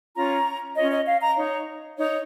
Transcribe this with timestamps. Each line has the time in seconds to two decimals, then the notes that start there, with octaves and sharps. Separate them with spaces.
0.16 C#4 F4 C#5 A#5
0.77 C#4 F4 C#5 D#5
0.92 D#5
1.07 F5
1.21 A#5
1.36 D#4 C#5
1.97 D#4 C#5